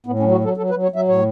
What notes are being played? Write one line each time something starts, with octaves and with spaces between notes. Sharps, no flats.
A2 B3
C#4
F#3
F#4
F#3 A4
F#3 A4
B4
F#3
C#5
F#3 E5
A2 C#5